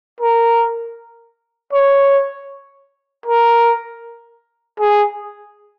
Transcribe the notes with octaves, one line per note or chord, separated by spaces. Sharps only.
A#4
C#5
A#4
G#4